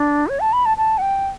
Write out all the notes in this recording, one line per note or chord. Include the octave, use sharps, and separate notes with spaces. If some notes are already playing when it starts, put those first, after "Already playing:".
Already playing: D4
C#5
A5
B5
A5
A5
F#5
G5